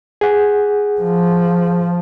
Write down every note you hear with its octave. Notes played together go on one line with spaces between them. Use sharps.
G#4 F#5
F3